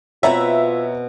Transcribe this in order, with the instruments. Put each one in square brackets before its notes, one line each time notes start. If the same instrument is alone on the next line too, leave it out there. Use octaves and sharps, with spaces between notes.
[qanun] B2 C4 B4 [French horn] F4 [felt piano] C#5 A#5 [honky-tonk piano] E5